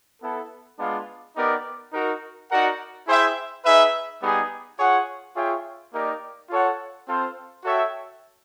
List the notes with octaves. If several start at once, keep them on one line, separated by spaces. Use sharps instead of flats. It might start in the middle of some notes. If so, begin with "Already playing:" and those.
B3 E4 A4
G#3 B3 D4 F4
B3 D#4 G4 A#4 D5
D#4 F#4 A#4
D#4 F#4 A#4 D5 F#5
E4 G#4 C5 E5 G5
D#4 G#4 B4 E5
G3 B3 D#4 G#4
F4 G#4 C#5 F#5
F4 G#4 C#5 E5 G5
A#3 D#4 G4 A#4 D5
F4 A4 C#5 F#5
C4 F4 A4 C5
F#4 A4 C#5 E5 G5